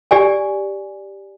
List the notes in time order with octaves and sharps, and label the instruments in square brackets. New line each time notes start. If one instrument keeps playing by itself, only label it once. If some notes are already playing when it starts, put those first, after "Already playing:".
[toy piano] G4 D5 G#5